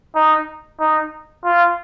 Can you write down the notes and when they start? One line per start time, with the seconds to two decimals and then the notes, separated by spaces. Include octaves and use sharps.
0.15 D#4
0.80 D#4
1.45 F4